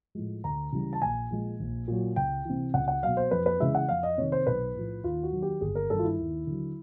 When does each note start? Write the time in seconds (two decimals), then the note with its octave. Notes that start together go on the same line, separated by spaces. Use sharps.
0.15 A2 F3 G#3
0.44 D2 A#5
0.72 C#3 E3 G3
0.93 A5
1.02 A#1 G#5
1.30 A#2 F3 G#3
1.60 A#1
1.88 A#2 F#3
2.16 C#2 G5
2.45 C3 E3
2.74 C#2 F#5
2.88 F#5
3.03 B2 F#3 F5
3.17 C5
3.31 F2 B4
3.46 B4
3.60 C#3 E3 G#3 E5
3.75 F#5
3.88 F2 F5
4.03 D#5
4.18 C3 D#3 C#5
4.32 C5
4.46 B1 B4
4.75 A2 F3
5.04 D#2 F4
5.23 F#4
5.32 D#3 F#3
5.42 G4
5.61 G1 G#4
5.75 A#4
5.90 G2 D#3 A4
5.99 F4
6.04 E4
6.19 D#2
6.47 D3 F#3